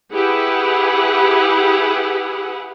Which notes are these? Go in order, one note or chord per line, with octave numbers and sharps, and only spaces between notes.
E4 G4 G#4 B4 F#5